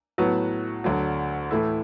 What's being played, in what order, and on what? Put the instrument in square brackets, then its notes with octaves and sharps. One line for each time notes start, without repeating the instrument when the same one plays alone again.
[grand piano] A2 F#3 B3 F#4
D2 D3 F#3
A2 E3 A3 E4